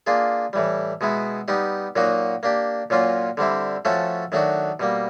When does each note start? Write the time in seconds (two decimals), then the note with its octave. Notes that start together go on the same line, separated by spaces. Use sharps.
0.07 A#3 D4 F4 G#4
0.53 A2 E3 G3
1.01 B2 G#3 B3 E4
1.48 G3 B3 D#4 G4
1.96 A#2 F#3 A#3 D#4 F#4
2.43 A#3 D4 G4
2.90 A#2 F#3 A#3 C#4 F4
3.37 D3 G3 C4 E4
3.85 F3 A3 C#4 F#4 A4
4.32 D#3 F#3 A3 D4 F#4
4.80 B2 G3 A#3